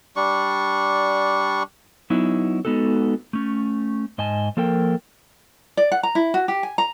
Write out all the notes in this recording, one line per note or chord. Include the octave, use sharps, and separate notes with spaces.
G3 D4 C#6
F#3 B3 D#4 E4
G#3 B3 D#4 F#4 A4
A3 C#4
G#2 D#5 G#5 A5
F3 A#3 A4 A#4 G5
D5
F#5
A#5
E4
F#4
G4
G#5
A#5